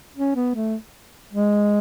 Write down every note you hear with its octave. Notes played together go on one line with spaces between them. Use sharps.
C#4
B3
A3
G#3